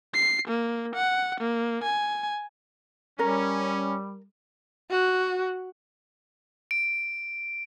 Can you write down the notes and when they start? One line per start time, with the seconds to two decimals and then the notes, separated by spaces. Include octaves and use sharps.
0.14 C7
0.48 A#3
0.96 F#5
1.41 A#3
1.83 G#5
3.19 G3 C#4 A#4
4.91 F#4
6.71 D7